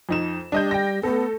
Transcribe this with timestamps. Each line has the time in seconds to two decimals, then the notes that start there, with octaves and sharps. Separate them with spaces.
0.09 F2 D#4 E7
0.52 G3 D4 D#5 G6
0.71 G5 A#6
1.03 A3 B3 A4